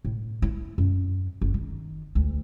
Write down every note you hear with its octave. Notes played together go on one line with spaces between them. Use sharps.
A2
E4
F#2
F#1
D#3
D2